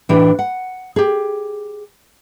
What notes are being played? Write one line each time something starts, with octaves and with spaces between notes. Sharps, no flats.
A2 E3 D4 G4
F#5
G4 G#4